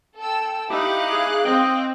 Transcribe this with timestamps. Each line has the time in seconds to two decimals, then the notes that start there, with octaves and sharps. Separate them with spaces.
0.18 A4 G5 E6
0.70 D#4 E4 G4 F5 D6 F#6
1.11 G#4
1.45 C4 D#5 G5